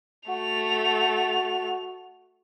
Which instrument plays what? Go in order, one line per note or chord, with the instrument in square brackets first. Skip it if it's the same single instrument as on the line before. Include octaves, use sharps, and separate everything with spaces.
[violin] A3 F7 [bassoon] F#4